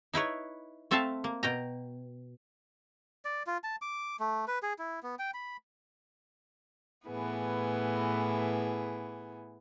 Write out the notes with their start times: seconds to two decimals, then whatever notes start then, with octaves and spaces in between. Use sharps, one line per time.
0.13 D#4 E4 B4 C#5
0.91 A3 C4 A4 E5 F5 A5
1.24 A#3
1.43 B2 G5 A#5
3.25 D5
3.47 F4
3.64 A5
3.82 D6
4.20 A3
4.48 B4
4.63 G#4
4.79 E4
5.03 B3
5.19 G5
5.34 B5
7.07 A2 E3 B3 G#4